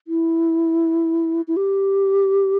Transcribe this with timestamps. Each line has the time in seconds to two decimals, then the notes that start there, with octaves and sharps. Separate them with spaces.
0.08 E4
1.48 E4
1.56 G4